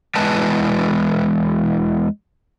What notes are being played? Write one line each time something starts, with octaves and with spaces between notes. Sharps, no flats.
E2 E3 G#3 B4 G#5 A5